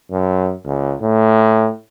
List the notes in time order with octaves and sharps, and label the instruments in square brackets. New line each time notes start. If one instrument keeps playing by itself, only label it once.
[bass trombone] F#2
C#2
A2